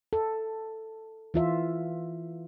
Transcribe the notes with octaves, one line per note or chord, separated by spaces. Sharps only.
A4
E3 F4 E5